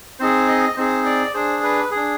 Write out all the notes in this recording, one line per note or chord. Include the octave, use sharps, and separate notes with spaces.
C4 D#4 G#4 C5
D#5
C4 D#4 G#4 C5
D5
D4 G#4 C5
B4
G#4
D4